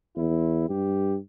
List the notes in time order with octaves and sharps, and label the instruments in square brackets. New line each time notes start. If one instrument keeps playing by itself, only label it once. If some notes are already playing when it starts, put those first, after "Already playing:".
[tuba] E2 [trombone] E4
[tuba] G2 [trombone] G4